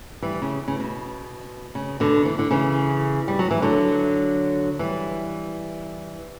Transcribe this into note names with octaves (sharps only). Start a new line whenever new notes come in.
E3 G3
C#3
C#3
B2
C#3
B2 D3
E3
D3
C#3 E3
G3
F#3
E3
D3 F#3
E3 G3